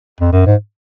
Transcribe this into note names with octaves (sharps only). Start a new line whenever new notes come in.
F2
F#2
G#2